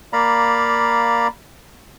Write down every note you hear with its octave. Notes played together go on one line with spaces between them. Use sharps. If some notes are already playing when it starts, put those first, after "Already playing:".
A#3 D5 F5 A#5 B5